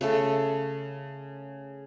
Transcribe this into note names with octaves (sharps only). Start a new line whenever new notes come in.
C#3 A3 A4